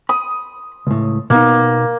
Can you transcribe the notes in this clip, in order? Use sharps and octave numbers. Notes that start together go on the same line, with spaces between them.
B5 D#6
C#2 A2
B2 A#3 B3 D#4